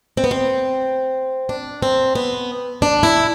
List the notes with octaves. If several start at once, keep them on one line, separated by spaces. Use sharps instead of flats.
C4
B3
C4
D4
C4
B3
D4
E4